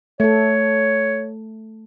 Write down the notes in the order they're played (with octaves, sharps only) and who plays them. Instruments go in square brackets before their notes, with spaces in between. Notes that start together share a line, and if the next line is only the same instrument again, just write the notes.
[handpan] A3 A4 [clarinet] C#5